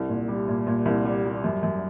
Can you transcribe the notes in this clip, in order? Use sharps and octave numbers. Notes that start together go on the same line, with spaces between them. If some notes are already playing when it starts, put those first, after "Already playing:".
Already playing: C2
A#2
G3
A#2
A#2
C2
G3
G3
F#2
F#2